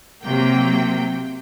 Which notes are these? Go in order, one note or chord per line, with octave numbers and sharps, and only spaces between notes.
C3 F#3 A#3 G5